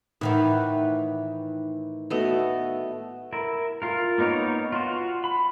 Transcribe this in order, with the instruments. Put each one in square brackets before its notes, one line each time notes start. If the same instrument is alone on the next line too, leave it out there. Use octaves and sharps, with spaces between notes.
[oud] A2 D#3 E3 [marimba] D#4 F#5 [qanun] B4
[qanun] A3 B3 D#5 [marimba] F#4 B4
[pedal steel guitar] E4 A#4
F4 A#4
A#3 B3 D#4 A#4 C#5
F4 F#4
B5